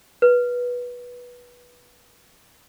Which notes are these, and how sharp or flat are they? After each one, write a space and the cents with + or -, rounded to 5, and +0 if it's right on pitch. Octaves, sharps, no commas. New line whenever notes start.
B4 -15